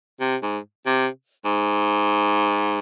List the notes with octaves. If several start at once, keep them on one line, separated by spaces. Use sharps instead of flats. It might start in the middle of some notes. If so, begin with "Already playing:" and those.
C3
G#2
C3
G#2